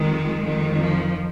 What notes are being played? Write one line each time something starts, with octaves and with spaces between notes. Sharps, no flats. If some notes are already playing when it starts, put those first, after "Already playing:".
Already playing: F2 D#3 G#3
F2 D#3
F3